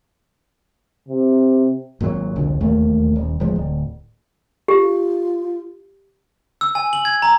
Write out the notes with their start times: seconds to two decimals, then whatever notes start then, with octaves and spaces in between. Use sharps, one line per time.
1.08 C3
2.01 G#1 A#2 E3 F#3
2.36 E1 C2 A#2 D3
2.60 E1 D#2 A3 A#3
3.16 D#1
3.40 D1 A1 F3 G#3
3.56 D1
4.68 F4 G4
6.61 E6
6.75 G#5
6.93 F#7
7.05 G#6
7.22 A#5